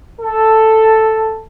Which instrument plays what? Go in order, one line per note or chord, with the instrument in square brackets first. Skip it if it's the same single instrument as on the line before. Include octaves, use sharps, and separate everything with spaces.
[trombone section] A4